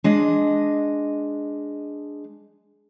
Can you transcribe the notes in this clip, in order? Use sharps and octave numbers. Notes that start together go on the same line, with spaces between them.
G#3 D4 D#5